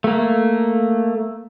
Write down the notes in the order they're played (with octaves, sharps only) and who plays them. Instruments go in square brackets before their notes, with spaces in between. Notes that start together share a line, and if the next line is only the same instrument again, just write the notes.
[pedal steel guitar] A3 A#3